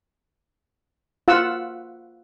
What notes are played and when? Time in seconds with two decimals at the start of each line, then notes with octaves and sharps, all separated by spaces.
1.28 F4 F#5 E6